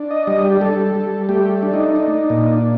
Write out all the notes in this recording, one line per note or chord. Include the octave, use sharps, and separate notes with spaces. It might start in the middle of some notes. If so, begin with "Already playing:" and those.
Already playing: D4
D#5
G3 D#5
G4
G3 A4
G3
A3 G4
D4
D#4
D4
A#2